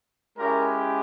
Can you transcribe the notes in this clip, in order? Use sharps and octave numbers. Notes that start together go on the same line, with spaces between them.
G#3 C#4 E4 G4 A#4